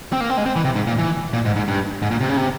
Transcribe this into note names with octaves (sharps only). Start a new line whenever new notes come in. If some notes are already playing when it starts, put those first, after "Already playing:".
C4
A#3
C4
G#3
C4
E3
C3
G#2
A#2
E3
A#2
G#2
G#2
G2
G#2
A#2
C3
C#3
C3